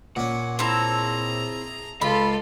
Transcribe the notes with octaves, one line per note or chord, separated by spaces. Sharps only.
A#2 C#4 F#5
C4 E4 G#4 A5 A#5
C#2 F4 A4 F5 B5